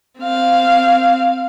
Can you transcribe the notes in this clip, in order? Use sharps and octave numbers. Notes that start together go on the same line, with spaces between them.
C4 F5